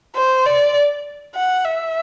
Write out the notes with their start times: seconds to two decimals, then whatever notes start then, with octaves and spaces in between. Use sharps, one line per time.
0.16 C5
0.46 D5
1.36 F#5
1.65 E5